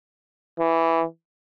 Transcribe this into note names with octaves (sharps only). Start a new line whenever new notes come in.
E3